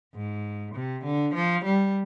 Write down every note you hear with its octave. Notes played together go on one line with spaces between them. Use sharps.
G#2
C3
D3
F3
G3